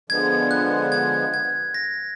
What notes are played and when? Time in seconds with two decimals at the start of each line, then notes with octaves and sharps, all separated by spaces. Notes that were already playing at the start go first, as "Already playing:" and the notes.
0.10 D3 F3 G#3 B3 G#6
0.51 F#6
0.92 G#6
1.34 G#6
1.74 A#6